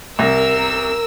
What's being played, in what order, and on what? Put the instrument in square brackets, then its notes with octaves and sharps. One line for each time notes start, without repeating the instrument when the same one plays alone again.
[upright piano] C2 A#6 [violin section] A#4 E6